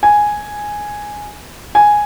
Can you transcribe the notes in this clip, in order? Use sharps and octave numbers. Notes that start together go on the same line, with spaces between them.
G#5
G#5